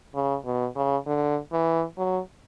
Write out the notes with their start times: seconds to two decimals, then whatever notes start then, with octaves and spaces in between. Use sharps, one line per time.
0.15 C#3
0.45 B2
0.76 C#3
1.06 D3
1.52 E3
1.98 F#3